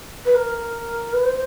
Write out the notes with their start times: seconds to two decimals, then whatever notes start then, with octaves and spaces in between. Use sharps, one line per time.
0.25 B4
0.34 A#4
1.13 B4
1.24 C5